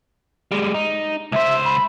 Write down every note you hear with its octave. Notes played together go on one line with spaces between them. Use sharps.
G3 G#3
D#4
C#2 C5 E5
B5